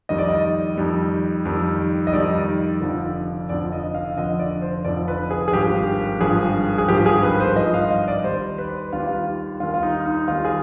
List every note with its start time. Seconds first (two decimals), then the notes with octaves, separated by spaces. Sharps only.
0.09 F2 D#3 G3 D#5
0.18 D5
0.29 D#5
0.77 F2 D#3 G3
1.45 F2 D#3 G3
2.07 D#5
2.13 F2 D#3 G3 D5
2.81 F1 F2 D3 F3
3.49 F1 F2 D3 F3 D5
3.72 D#5
3.95 F5
4.17 F1 F2 D3 F3 D#5
4.39 D5
4.62 C5
4.85 F1 F2 D3 F3 D5
5.08 B4
5.31 G#4
5.48 G#4
5.53 G#1 G2 F3 G4
6.21 G#1 G2 F3 G#4
6.78 G#4
6.88 G#1 G2 F3 G4
7.06 G#4
7.23 B4
7.40 C5
7.56 G#1 G2 F3 D#5
7.74 F5
7.91 D#5
8.08 D5
8.24 D#2 D#3 G3 C5
8.58 B4
8.93 D#2 D#3 G3 F4
9.00 G4
9.07 F4
9.60 D#2 D#3 G3 F4
9.74 F4
9.83 D#4
10.06 D#4
10.28 D#2 D#3 G3 F4
10.45 G#4